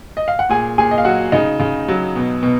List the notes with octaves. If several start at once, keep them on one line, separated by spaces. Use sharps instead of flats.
D#5
F5
F#5
A#2 G#4 G#5
A#2 G#4 G#5
D#5
F5
F#3 F#4 F#5
C#3 D#4 D#5
C#3
F#3
B2
B2